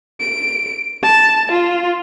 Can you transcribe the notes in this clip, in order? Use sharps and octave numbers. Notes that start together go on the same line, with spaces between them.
D7
A5
F4